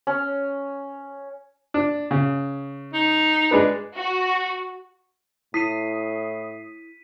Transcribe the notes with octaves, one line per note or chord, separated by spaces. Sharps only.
C#4
D4
C#3
D#4
G#3 D4 B4
F#4
A2 E4 D#6 B6 C7 D#7